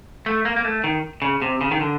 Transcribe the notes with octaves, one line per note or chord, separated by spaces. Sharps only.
A3
A#3
A#3
A3
D#3
C#3
C3
C#3
D#3
D3